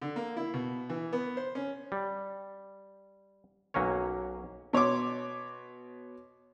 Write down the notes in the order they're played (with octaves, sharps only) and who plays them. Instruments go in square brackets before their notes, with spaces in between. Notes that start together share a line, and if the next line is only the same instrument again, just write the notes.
[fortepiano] D3
A#3
E4
B2
E3
B3
C5
C#4
[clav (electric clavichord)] G3
B1 F#3 A#3 C#4 C#5
[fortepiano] B2 C#5 C6 D6